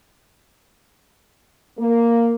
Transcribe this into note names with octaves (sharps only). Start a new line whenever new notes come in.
A#3